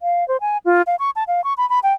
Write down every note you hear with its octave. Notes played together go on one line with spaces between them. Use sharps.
F5
C5
G#5
F4
F5
C#6
A5
F5
C#6
B5
B5
G5